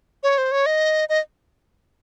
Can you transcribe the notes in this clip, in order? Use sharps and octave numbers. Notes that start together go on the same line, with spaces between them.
C#5
C5
C#5
D#5
D#5